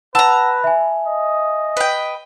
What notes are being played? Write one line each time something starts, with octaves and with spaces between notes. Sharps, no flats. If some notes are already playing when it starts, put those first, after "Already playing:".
B4 F#5 A5 A#5 E6
E5 G#5
D#5
B4 G5